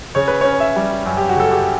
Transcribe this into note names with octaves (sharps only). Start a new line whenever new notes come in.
C#3 C#5
B4
C#4 C#5
E5
G3
F#2
G4
F#4
C#3 A4
G4